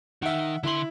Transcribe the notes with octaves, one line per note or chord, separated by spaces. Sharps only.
D#3 D#4 E5 F#5
D3 E4 C6 F#7